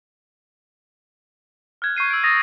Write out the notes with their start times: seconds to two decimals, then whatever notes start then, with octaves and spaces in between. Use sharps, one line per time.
1.82 F6 F#6 G#6
1.96 C#6 G6 C7 D#7
2.10 E6 D7
2.24 D#6 A6 A#6